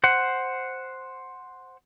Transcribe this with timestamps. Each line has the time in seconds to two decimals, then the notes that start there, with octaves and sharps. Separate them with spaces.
0.04 C5 F#5